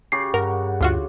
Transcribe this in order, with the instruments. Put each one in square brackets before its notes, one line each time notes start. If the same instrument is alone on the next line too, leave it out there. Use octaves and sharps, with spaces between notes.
[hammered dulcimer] C#3 G4 C#6 [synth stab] C7
[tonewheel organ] G2 F#5 [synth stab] A#4
[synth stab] D2 F4 F#4